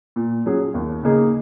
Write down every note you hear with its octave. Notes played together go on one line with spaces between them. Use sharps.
A#2
F#3 C#4 G#4
D#2
C#3 A#3 D#4 G#4